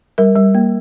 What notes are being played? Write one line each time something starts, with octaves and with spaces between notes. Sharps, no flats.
G3 A#4
G3
A#3